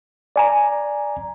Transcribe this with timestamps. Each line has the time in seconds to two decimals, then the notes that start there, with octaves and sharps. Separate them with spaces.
0.36 D5 G#5 A#5